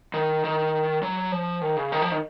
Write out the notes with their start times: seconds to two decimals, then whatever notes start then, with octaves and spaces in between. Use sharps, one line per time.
0.14 D#3
0.44 D#3
1.03 F#3
1.32 F3
1.61 D#3
1.77 C#3
1.92 D#3
2.02 F3
2.12 D#3